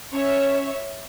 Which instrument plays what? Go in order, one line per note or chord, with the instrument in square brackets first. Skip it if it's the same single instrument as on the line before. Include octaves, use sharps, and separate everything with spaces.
[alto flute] C#4 [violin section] C#5 E5